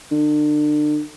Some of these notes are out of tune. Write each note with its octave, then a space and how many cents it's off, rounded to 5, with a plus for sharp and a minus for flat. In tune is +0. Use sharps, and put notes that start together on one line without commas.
D3 +40